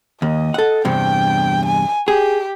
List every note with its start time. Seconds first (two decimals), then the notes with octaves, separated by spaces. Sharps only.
0.22 D#2 D#5
0.54 A4 F#5
0.85 E2 G2 C3 G5
1.66 G#5
2.08 G4 G#4